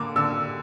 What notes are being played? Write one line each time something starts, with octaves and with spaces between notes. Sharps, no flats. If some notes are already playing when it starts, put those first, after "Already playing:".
Already playing: D3 A#3 D6
D3 E6